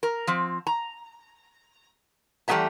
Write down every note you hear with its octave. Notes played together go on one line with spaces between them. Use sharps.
A#4
F3 C4
A#5
E2 G3 A3 B3 E5 A#5